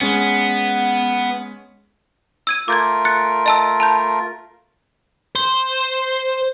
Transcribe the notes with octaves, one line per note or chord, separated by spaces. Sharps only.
G#3 B3 C#4
E6 G#6 D#7
A3 F4 A#4 D6 G6 G#6
F#6 A6 C#7
D#5 A5 E6
A5 B5 G6
C5